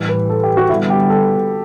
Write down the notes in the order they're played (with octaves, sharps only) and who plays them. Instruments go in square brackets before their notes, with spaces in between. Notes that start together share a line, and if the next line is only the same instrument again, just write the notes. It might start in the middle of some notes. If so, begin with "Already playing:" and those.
Already playing: [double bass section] A2 E3 G3
[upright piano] B4
A4
G4
F#4
[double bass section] D3 G3 B3 [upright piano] E4
[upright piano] G4
A4